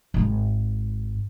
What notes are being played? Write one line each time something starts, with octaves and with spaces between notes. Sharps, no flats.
G#1 G#2